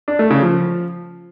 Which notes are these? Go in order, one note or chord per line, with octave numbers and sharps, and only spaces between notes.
D4
A3
C#3
F3